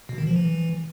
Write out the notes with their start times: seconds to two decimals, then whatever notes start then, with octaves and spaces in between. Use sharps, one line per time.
0.09 B2
0.18 D#3
0.27 F3
0.36 E3